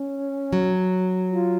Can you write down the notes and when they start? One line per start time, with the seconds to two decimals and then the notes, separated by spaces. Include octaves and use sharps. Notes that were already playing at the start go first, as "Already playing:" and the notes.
Already playing: C#4
0.53 F#3
1.30 F4